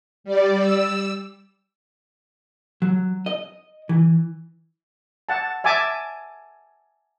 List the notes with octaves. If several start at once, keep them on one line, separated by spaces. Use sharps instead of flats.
G3 D5
E6
F#3
D#5
E3
F#5 A5
E5 G#5 A5 D6